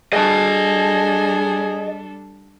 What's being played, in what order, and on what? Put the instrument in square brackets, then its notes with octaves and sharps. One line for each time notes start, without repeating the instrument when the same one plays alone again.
[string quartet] G3 D4 A4 [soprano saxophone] G#4 [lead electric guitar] D#5 A5